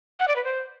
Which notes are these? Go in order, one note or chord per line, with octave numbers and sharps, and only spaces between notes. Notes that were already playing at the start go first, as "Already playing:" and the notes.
F#5
D5
B4
C5